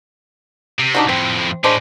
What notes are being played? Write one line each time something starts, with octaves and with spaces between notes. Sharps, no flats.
C3
D4 D#4 F#4
F2 A2 C4
A2 G#3 C#4 D4 C5